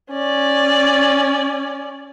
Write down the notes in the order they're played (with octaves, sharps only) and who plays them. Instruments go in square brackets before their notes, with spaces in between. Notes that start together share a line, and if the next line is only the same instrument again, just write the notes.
[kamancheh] C#4 D5